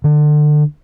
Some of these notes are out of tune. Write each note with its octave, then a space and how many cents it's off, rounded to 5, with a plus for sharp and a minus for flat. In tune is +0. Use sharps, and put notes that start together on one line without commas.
D3 +30